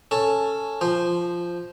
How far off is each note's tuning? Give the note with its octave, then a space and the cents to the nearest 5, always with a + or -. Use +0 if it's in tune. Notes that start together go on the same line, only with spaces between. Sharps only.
C#4 +0 A4 +5
F3 -5 C5 +0